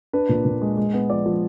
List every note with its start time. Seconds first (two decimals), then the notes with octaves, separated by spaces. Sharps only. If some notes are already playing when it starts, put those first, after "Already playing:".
0.13 D4 B4
0.29 A#2
0.45 A#2
0.62 G#3
0.77 G#3
0.94 B3
1.10 F3 D5
1.26 F3